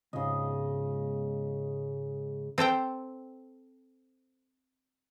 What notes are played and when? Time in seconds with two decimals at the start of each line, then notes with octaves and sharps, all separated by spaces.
0.13 C#2 G#2 C#3 D#5
2.58 C4 A4 C5 G5